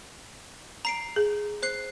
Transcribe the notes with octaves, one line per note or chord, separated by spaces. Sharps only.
A#5 C7 D7
G#4
C5 F#6 C7